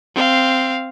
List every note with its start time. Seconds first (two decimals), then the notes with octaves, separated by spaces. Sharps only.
0.15 C4 F5